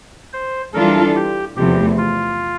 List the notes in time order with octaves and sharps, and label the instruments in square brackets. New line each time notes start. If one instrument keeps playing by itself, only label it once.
[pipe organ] C5
[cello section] E3 G3 D4 F4 A4 [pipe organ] A#4
[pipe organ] G4
[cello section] E2 C3 F3 A3 [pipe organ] G4
[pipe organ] F4